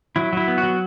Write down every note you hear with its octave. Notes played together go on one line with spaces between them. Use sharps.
F#3 E4
F#3 E4
B3
F#4
F#3